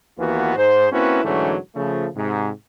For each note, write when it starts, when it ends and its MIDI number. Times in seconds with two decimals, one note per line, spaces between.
0.18 0.55 39
0.18 0.55 52
0.18 0.55 58
0.18 0.55 59
0.18 0.55 65
0.18 0.55 66
0.56 0.86 44
0.56 0.86 72
0.91 1.21 58
0.91 1.21 60
0.91 1.21 61
0.91 1.21 64
0.91 1.21 66
0.91 1.21 71
1.24 1.56 44
1.24 1.56 50
1.24 1.56 52
1.24 1.56 54
1.24 1.56 57
1.24 1.56 61
1.75 2.07 49
1.75 2.07 53
1.75 2.07 57
2.15 2.49 44
2.15 2.49 48